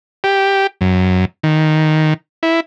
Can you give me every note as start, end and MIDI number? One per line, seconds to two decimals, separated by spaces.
0.24 0.67 67
0.81 1.25 42
1.43 2.14 51
2.43 2.60 64